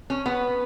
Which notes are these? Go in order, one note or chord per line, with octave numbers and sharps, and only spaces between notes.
C#4
B3